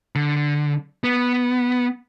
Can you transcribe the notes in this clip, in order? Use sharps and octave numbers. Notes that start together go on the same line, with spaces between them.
D3
B3